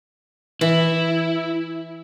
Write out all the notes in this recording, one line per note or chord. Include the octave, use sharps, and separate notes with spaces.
E3 E4